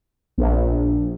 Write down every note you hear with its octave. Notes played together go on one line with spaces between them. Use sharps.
A#1